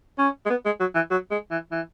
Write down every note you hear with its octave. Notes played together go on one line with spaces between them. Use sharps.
C#4
G#3
B3
G#3
F#3
E3
F#3
G#3
E3
E3